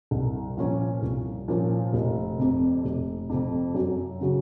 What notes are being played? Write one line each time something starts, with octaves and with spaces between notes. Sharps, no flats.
C2
A#2 F3 A#3 C#4
C2
A#2 F3 A#3 C#4
F1
F2 C3
F1
F2 C3
F#2
C#3 F#3 C#4